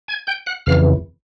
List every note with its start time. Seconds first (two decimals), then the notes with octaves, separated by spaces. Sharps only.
0.08 G#5 G#6
0.27 G5 G6
0.46 F#5 F#6
0.66 F2 C#3 E3 F5 F6